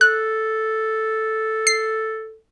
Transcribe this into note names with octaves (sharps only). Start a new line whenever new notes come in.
A4 F#6
C7